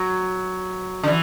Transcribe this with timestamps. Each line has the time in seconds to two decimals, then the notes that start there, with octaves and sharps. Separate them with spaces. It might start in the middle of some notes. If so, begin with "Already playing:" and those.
Already playing: F#3
1.03 D3
1.08 E3